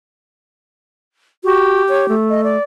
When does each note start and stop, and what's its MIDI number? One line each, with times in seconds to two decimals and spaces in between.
1.44 1.83 66
1.44 2.14 67
1.89 2.06 73
2.09 2.57 57
2.30 2.41 75
2.44 2.63 74